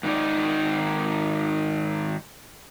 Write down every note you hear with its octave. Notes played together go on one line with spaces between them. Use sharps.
G#2 D#3 D#4 D5